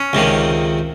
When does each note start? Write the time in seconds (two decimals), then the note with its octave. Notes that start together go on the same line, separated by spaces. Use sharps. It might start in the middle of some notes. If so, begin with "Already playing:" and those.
Already playing: C#4
0.13 C#2 C3 D#3